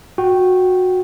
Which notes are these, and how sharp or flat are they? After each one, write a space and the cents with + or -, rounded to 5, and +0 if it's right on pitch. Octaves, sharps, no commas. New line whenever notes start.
F#4 -15 G5 -15